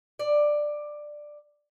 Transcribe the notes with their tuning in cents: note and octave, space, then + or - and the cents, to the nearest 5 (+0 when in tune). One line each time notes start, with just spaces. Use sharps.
D5 +10